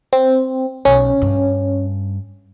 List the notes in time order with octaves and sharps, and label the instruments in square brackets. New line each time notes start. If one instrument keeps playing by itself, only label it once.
[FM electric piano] C4
[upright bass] B1 [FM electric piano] C#4
[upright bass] G2